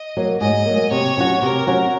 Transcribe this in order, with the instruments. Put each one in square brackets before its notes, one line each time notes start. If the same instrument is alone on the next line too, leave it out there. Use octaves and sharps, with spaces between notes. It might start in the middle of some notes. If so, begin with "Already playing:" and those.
Already playing: [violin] D#5
[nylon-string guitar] F#3 A#3
[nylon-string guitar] G#2 [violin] D#5
[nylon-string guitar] F#3 A#3
[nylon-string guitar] C3 [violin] C#5
[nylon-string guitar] F#3 C#4 F#4
[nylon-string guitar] C3 [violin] A#4
[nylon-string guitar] F#3 C#4 F#4